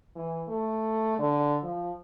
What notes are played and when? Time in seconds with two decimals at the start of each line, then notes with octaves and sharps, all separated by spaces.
0.16 E3
0.48 A3
1.19 D3
1.63 F3